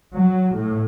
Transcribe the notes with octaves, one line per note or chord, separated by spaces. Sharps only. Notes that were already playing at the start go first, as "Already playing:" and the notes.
F#3
A2